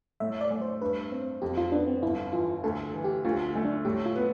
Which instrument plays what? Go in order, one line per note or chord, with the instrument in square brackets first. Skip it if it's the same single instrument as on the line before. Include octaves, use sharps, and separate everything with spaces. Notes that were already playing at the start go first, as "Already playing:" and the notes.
[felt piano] A2 [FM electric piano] E5
[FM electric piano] D5
[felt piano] A3
[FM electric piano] C5
[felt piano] G2 [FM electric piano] B4
[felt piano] C4
[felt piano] F2 [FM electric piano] G4
[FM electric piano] F4
[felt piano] B3 [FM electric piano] D4
[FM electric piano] C4
[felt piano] G1 [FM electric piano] E4
[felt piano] E3 [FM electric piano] F4
[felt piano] D2 [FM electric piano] A4
[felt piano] E3
[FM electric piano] G4
[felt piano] D2 [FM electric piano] F4
[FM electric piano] F4
[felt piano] A3
[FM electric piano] D4
[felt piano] A2 [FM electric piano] G4
[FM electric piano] F4
[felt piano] B3